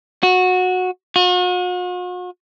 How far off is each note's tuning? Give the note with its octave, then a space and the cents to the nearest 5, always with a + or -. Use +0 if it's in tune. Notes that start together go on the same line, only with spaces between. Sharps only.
F#4 -15
F#4 -45